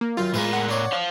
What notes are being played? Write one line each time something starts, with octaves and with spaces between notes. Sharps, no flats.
A#3
F#2 D#3 F4
A2 D#3 G#3 A#4 B4
F#5
D4 C#5
C5 F5